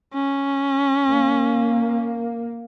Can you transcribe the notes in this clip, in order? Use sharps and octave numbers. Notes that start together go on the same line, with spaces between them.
C#4
A#3